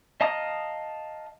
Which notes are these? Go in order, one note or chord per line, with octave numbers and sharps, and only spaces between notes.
D#5 F5 A5 A#5 D#6